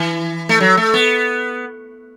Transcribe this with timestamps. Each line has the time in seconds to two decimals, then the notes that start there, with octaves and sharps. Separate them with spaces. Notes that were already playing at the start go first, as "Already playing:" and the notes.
Already playing: E3
0.49 A3
0.61 F#3
0.77 A3
0.94 B3